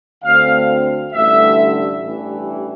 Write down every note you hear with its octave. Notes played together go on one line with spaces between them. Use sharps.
D2 D3 A3 C4 F5
A1 G2 D3 A3 E5
A1 G2 E3